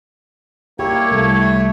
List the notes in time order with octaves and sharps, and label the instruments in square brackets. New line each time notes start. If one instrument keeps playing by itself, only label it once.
[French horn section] A#3 [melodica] E4 C#5 [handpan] G4
[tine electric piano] C2 [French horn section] A3